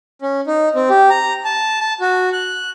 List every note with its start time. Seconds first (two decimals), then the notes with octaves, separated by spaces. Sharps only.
0.22 C#4
0.47 D#4
0.75 C4
0.90 G4
1.10 A#5
1.45 A5
1.81 A5
2.01 F#4
2.33 F#6